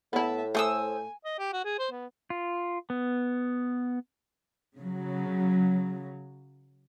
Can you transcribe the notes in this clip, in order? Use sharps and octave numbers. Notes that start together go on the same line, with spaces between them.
A2 B3 E4 E5 A5
A3 A4 C5 G#5 D#6 E6
D#5
G4
F#4
G#4
C5
B3
F4
B3
C#3 F#3